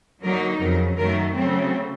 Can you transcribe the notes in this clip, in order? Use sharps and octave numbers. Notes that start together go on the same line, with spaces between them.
D3 F#3 A#3 D#4 A#4
F2 C#3 F#3 A#4
F#2 D#3 F#3 A3 A#4
C#3 F#3 A3 C4